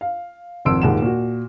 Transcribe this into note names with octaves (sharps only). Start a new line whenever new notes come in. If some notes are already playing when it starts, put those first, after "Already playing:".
F5
G#1 F2 C6 E6 D7
D#1 D#2 G#2 F#5 E7
A#2 F#4